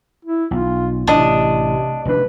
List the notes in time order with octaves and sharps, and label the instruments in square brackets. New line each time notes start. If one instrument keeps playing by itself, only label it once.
[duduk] E4
[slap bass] B1 [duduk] F4
[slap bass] A1 [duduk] C3 [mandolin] D4 D#5
[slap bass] F1 F2 D4 [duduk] B4